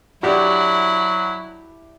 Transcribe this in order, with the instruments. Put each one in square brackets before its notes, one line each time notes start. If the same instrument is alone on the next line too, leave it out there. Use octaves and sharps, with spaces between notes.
[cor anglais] F#3 [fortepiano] D4 G4 [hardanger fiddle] E4 [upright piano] F#4